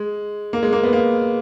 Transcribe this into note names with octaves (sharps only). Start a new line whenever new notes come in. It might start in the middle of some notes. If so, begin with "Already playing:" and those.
Already playing: G#3
A#3
G#3
A#3
B3
A#3